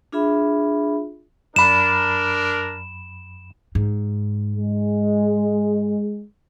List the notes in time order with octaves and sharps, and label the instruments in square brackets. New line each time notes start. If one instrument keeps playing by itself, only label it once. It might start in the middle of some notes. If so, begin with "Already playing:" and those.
[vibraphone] D4 F4 G#4 E5 B5
[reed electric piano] F#2 B5 [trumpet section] D4 A#4 [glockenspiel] E7
[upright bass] G#2
[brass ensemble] G#3